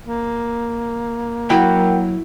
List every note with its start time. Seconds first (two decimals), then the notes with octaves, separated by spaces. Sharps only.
0.06 A#3
1.50 F#3 E4 F#4 A#4 F#5 G5